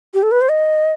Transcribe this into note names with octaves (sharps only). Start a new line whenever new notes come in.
G4
A4
B4
C5
D#5